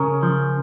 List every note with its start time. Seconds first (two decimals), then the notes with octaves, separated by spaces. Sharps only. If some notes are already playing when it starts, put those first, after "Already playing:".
Already playing: C#3 C#4 A#4
0.23 F3